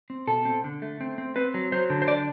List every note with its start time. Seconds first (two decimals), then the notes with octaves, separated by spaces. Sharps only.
0.10 C4
0.27 B2 A4
0.45 C4
0.64 D3
0.82 A3
1.01 C4
1.18 C4
1.36 C4 B4
1.54 F#3
1.72 F#3 C5
1.90 D3
2.02 C5
2.08 D4 D5